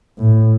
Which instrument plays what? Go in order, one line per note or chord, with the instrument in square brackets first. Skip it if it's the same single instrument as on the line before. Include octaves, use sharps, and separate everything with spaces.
[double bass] A2